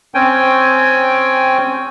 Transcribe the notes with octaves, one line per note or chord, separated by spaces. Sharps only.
C4 C#4 G5 G#5